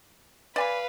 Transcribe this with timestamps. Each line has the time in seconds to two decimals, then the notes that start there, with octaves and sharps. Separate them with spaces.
0.56 B4 D5 F5 G#5 B5